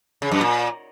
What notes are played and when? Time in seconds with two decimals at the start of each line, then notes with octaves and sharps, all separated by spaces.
0.22 C#3
0.32 F#2
0.41 A#2